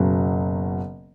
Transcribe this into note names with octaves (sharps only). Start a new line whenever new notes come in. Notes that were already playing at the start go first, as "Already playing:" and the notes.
Already playing: F#1 B2 F#3